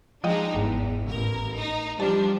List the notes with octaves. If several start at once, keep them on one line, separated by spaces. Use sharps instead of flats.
F3 G#3 D4 D#4 D#5 G5
G1 E2 G#2
A1 A#4
D#4
F3 G3 D4 A5